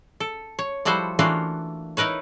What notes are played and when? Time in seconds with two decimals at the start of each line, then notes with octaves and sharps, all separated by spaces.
0.20 A4
0.59 C#5
0.85 F3 G3 E4 F#4 A4 C5
1.19 E3 A3 A#3 D4 F4 F#4
1.97 D#4 E4 A#4 B4 C#5